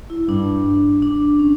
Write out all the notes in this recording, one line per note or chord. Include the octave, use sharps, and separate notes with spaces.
E4
G2 D4
D4
C#4